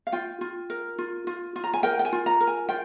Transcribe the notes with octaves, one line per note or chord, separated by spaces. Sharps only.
F5
F4 G5
F4
A#4
F4
F4
F4
A#5
G#5
A#4 G5
G5
G#5
F4
A#5
A#4
G#5
F4 G5